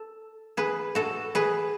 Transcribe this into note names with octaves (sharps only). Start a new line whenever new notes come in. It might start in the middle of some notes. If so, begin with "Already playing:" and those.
Already playing: A4
G#4 B4
F#4 A4
G#4 B4